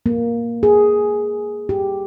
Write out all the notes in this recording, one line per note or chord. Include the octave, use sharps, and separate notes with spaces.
A#3
G#4
G4